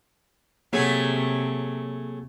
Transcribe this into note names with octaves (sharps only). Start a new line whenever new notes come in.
C3 F#3 A3 A#3 G#4